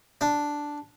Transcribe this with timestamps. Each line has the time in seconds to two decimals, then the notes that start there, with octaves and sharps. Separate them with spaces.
0.21 D4